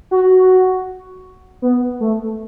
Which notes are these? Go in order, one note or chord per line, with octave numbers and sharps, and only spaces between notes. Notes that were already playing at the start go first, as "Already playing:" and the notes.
F#4
B3
A3